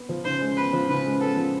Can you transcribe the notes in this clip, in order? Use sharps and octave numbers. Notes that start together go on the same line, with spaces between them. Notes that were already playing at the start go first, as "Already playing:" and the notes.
Already playing: B3
F3
C#3 C5
G#3
B3 B4
F3
C#3 B4
G#3
B3 A4
F3